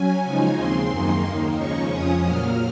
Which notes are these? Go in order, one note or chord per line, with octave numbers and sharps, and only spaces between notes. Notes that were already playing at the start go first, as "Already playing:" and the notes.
Already playing: F#3 C#4 G#5
C#3 F3 G#3 D#4
D#2 C#3 G#3 C4 C6
F#2 D#3 A#3 D#4
D#2 D#3 A#3 D#4
C#3 F3 G#3 C#4 C#6
F2 C#3 F3 G#3 C#4 D#6
A#2 F#3 A#3 F6